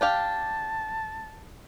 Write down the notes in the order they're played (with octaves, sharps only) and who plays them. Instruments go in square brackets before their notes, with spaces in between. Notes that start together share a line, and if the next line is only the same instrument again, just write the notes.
[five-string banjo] D4 G4 F5 [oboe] A5